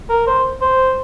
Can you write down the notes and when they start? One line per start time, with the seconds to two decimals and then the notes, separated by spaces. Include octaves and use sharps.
0.09 A#4
0.27 C5
0.61 C5